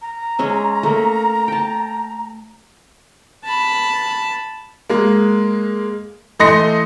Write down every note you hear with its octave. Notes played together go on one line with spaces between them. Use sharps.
A#5
G#3 C#4 E5
A3 A#3
G5 A5
A5 B5
G#3 A#3
E3 A3 D#5 C6 A#6 C#7